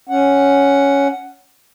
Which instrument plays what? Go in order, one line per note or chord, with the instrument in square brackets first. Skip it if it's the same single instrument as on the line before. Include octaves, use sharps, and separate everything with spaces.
[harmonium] C#4 F#5